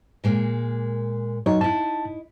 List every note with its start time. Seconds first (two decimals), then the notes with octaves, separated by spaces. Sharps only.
0.24 A#2 G#3 A#3
1.46 F#3 D#4 C#5
1.61 D#4 E4 A5